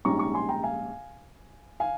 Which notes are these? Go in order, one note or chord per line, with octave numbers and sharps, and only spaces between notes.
A#1 G#2 G3 C#4 A#5 C#6
A#5 C#6
G#5 C6
G5 A#5
F5 G#5
F5 G#5